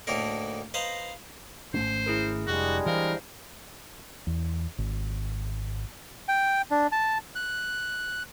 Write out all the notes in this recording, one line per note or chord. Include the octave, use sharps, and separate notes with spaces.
D2 A2 A3 A#3 D#4 A#4
B4 C5 D#5 F5 A#5
G#1 A3 C#4 C5
E4 G#4 A#4
F1 G3 G#3 D4 F#4
E3 E4 A#4 C5 F5
E2
G#1
G5
D4
A5
F#6